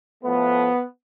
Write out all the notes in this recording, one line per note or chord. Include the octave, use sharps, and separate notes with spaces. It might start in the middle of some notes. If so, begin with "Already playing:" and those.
A2 F3 A3 B3